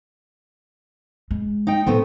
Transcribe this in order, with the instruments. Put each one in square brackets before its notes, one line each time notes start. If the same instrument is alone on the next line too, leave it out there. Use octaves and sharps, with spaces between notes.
[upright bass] G#3
[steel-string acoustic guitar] D#4 G5
[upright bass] A2 [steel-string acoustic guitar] A3 B3 C4